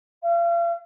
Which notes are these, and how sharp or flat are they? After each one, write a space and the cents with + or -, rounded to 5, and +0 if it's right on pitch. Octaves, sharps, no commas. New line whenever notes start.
F5 -40